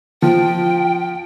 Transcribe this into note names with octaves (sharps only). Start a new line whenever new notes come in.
F3 G5